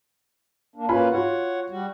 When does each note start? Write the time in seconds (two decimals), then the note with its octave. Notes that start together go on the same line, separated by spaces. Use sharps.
0.76 A#3 D4
0.89 A#3 C#4 F4 B4 G#5 B5
1.12 F4 F#4 C#5 F#5
1.69 G3 F#4